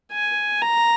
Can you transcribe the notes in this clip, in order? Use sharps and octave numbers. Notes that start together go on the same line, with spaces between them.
G#5
A#5